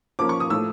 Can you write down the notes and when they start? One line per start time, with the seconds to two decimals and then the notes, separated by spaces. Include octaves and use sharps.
0.19 F3 A#3 C#4 D6
0.29 C#6
0.40 D#6
0.50 A2 F3 A3 E6